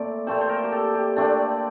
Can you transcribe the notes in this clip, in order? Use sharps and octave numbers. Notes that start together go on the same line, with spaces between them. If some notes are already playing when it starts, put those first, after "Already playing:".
Already playing: A#2 A3 C4 D5
A#2 A3 C4 C5
C5
A#4
G4
A4
G4
A#2 A3 C4 D4